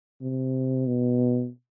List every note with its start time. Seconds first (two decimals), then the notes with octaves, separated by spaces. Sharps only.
0.22 C3
0.87 B2